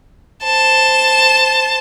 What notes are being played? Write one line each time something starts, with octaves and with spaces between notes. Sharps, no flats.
C5 A5